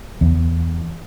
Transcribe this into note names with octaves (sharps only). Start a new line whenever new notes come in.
E2